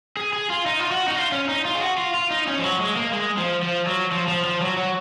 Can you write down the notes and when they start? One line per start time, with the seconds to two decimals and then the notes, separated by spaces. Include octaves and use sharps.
0.17 G#4
0.33 G#4
0.50 F4
0.66 D#4
0.80 F4
0.91 F#4
1.08 D#4
1.16 F4
1.32 C#4
1.49 D#4
1.65 F4
1.75 G#4
1.81 F#4
1.98 F4
2.14 F4
2.31 D#4
2.47 C#4
2.58 F3
2.64 F#3
2.80 G#3
2.96 A#3
3.13 G#3
3.38 F3
3.63 F3
3.87 F#3
4.12 F3
4.28 F3
4.45 F3
4.61 F#3
4.77 F#3